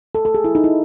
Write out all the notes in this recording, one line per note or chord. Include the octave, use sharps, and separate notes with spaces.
A4
A4
G#4
E4
D#4
E4